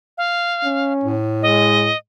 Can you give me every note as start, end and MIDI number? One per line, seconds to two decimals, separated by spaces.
0.18 0.93 77
0.64 1.15 61
1.04 1.90 45
1.42 1.90 56
1.42 1.97 75